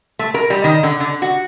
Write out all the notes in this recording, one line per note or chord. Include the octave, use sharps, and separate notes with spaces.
A3
A#4
G3
D#3
D3
D3
F#4